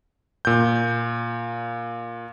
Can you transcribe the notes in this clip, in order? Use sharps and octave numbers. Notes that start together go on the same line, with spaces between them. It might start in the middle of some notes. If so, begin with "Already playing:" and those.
A#2 G6